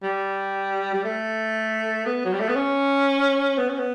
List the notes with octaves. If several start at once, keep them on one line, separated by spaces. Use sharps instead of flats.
G3
G3
A3
B3
F#3
G3
A3
B3
C#4
B3
C#4
B3